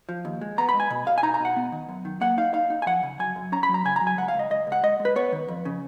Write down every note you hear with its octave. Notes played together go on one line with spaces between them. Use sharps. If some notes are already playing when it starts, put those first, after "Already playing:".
F3
D#2
G#3
B3 A#5
B5
G#3
G#5
B2
B2 F5
G#5
D#4 A#5
A#5
B2
F#5
B3
D#3
F#2
D#3
A#3 F#5
D#4 F5
D#4 F5
D#4
G#5
F3 F#5
C#3
F#2 G#5
F#2
C#4 A#5
B5
F#3
A#5
C#3 G#5
A#5
F#3
G#5
C#2 F#5
F5
C#2
D#5
C#2 D#5
C#2
F#5
G#3 D#5
G#3
B4
B3 C#5
D#3
F2
C#3